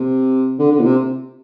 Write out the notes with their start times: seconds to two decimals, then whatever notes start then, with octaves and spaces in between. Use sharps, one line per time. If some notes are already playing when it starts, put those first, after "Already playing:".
Already playing: C3
0.59 D3
0.71 D3
0.79 A#2
0.84 C3